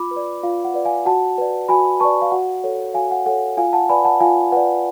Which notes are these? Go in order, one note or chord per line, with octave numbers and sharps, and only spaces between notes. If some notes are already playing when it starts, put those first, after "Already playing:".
Already playing: F4 B5 D6
B4
D5
F4 F5
F#5
B4 D5
F5 G#5
F#4 F#5 A5
B4 D5
F#4 G#5 B5
B4 D5 A5 C#6
F5
F#4 F#5
A4 C#5
F#4 F5 G#5
F#5
A4 C#5 F#5
F4 F5 G#5
F#5 A5
B4 D5 G#5 B5
F#5 A5
F4 F5 G#5
B4 D5 F#5